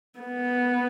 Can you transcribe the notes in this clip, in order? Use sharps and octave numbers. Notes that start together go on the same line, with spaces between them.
B3